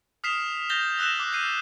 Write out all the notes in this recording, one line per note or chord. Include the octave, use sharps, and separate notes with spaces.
D#6 F6 B6 C7 E7 F7
G6 A6 A#6 F7 G7
E6 F#6 A#6 E7
D6
G6 C7 D#7